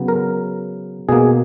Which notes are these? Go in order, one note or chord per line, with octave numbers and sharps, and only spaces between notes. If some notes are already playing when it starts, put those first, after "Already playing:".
Already playing: C#3 F#3 B3
A#4
B2 A#3 G#4